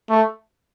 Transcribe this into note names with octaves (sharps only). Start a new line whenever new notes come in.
A3